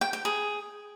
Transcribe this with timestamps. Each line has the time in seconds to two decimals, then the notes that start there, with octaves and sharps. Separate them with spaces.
0.01 G5
0.13 G5
0.25 G#4